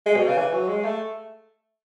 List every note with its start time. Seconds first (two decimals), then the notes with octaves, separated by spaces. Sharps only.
0.06 G#3
0.16 B2
0.27 C#3
0.37 E3
0.53 F#3
0.68 G#3
0.84 A3